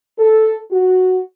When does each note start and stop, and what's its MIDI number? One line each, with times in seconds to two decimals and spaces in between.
0.18 0.57 69
0.71 1.19 66